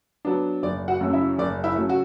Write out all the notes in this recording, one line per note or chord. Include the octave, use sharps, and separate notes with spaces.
F#3 B3 D4
F#1 D5
F#4 F#5
F#2 C#3 F#3 A3
E4 E5
F#1 D5
E4 E5
C#3 F#3 A3
F#4